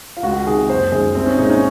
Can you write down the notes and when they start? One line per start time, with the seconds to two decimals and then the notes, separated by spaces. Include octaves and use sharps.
0.17 F4
0.23 C#2 F#4
0.46 C3 D#3 G#4
0.69 F#1 C5
0.92 F#2 D#3 G#3 G#4
1.15 C2 C4
1.26 C#4
1.38 A#2 G#3 D#4
1.50 C#4